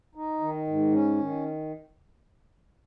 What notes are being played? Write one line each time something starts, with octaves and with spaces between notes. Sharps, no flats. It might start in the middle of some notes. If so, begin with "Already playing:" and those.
D#4
D#3
G#2
C#4
D#3